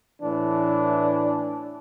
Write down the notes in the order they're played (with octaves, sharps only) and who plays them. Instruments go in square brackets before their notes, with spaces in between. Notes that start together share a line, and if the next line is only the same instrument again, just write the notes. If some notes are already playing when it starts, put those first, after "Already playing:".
[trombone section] A2 E3 D4